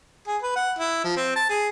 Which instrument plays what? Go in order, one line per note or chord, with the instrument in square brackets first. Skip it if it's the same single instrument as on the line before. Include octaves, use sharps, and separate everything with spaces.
[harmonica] G#4
B4
F#5
E4
F3
C4
A5
G#4